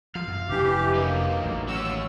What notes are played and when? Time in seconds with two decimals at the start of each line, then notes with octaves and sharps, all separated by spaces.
0.15 F3 F5
0.28 F#2
0.49 F1 E3 D4 G4
0.94 F#3 A#3 D#4
1.43 A1
1.68 D#2 C#4 F#4 E6